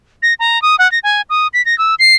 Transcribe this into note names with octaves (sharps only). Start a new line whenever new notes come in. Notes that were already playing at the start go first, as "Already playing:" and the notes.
A#6
A#5
D#6
F#5
A#6
G#5
D#6
B6
A#6
E6
C7